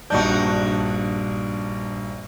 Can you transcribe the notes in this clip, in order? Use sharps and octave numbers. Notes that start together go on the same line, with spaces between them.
A#1 G2 D4 D#4 F#4 G6